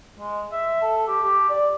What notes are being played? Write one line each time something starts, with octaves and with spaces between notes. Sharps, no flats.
G#3
E5
A4
G4
G4
D5